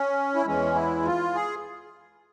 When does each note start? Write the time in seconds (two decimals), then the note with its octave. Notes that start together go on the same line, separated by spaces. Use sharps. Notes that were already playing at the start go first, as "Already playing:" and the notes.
Already playing: C#4
0.35 E4
0.45 E2 E3 G#3 C#4
0.75 E4
1.05 F4
1.35 G#4